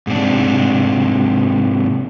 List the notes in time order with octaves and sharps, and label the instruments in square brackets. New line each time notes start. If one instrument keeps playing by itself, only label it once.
[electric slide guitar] G#2 C3 D4